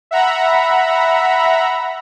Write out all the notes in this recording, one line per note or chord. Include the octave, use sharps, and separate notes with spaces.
E5 F#5 A#5 B5